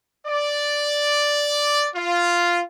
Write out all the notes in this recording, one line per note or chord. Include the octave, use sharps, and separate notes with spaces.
D5
F4